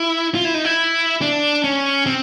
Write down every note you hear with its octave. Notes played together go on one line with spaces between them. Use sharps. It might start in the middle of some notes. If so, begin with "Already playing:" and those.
Already playing: E4
F4
E4
D#4
E4
D4
C#4
C4